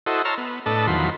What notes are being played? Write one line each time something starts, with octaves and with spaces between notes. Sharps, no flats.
E4 F#4 A4 C5 D#5
C#5 A5 A#5 C6 E6 F6
B3
A2 D4 A4 B4 D#5 A5
E2 D#3 F3 F#3 B5 C6